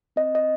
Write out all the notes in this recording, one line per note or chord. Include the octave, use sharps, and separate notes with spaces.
C4 D#5
D#5